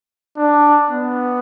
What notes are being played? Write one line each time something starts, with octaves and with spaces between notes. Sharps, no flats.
D4
B3